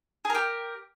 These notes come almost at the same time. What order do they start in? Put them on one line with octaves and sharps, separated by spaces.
G#4 A#4 G4